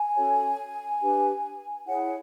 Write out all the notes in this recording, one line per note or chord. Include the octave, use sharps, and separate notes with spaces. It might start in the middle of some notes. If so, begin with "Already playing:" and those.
Already playing: G#5
C#4 F#4 A4 C#5
D4 G4 B4
E4 G#4 C#5 F#5